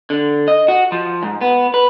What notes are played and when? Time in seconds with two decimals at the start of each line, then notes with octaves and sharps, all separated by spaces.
0.10 D3
0.48 D#5
0.68 F#4
0.92 F3
1.23 G#2
1.41 B3
1.74 B4